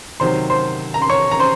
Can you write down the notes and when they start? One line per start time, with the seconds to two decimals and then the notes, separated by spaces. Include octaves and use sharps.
0.20 C3 D#3 F#3 C5 C6
0.50 C5 C6
0.94 A#5
1.02 C6
1.10 C#5 C#6
1.31 A#5
1.39 C5 C6